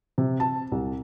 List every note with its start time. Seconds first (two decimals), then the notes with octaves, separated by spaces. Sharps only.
0.18 C3
0.40 A5
0.72 C2